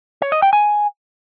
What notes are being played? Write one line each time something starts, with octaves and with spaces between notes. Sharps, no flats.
C#5
D#5
G5
G#5